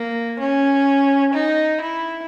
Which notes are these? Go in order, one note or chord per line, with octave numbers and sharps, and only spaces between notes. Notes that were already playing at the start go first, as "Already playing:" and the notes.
Already playing: A#3
C#4
D#4
E4